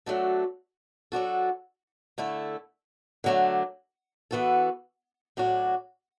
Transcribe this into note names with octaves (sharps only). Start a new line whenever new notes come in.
F#3 A3 D4 F#4 A4
F#3 D4 F#4 A4
D3 A3 E4 A4
D3 F#3 A3 D4
E3 B3 F#4 A4
A2 F#3 D4 F#4